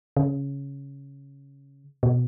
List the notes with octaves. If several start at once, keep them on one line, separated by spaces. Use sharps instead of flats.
C#3
B2